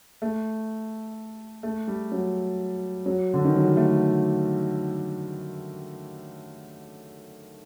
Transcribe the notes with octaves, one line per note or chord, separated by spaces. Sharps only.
A3
A3
G3
F#3
F#3
D3
D#3
F#3
G3
A3